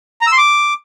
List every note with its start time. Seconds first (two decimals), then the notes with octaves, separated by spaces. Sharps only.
0.21 A#5
0.27 E6
0.32 C6
0.38 D6